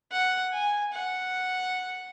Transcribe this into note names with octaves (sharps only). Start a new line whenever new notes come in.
F#5
G#5
F#5